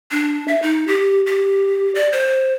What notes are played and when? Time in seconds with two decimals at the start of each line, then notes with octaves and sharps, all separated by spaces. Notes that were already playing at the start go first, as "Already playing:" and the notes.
0.11 D4
0.48 E5
0.62 D#4
0.87 G4
1.26 G4
1.95 D5
2.12 C5